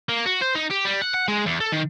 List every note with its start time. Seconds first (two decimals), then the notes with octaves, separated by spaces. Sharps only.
0.09 A#3
0.26 F#4
0.42 C5
0.56 D#4
0.71 G4
0.85 G3
1.02 F#5
1.14 F#5
1.28 G#3
1.46 E2
1.60 A4
1.72 D#3